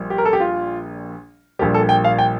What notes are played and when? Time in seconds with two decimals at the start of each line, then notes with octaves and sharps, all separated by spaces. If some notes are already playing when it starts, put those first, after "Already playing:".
Already playing: A#1 A#2 G3
0.10 G4
0.18 A#4
0.25 A4
0.33 G4
0.40 F4
1.59 A#1 A#2 G3 G4
1.74 A4
1.89 G5
2.04 F5
2.19 G5